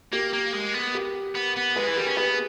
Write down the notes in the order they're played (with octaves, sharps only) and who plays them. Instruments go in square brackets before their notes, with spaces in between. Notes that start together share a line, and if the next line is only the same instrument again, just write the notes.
[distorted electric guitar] A#3 [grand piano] G4 A#4
[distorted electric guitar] A#3
G#3
B3
[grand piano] G4 A#4
[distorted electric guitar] B3
B3
[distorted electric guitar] G#3 [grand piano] G#4 B4
[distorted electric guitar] E3
[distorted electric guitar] G3 [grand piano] G4 A#4
[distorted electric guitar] C#4
[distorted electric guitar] B3 [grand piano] G#4 B4